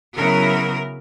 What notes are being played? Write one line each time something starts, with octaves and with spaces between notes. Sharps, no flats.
C#3 F#3 B3 E4 A#4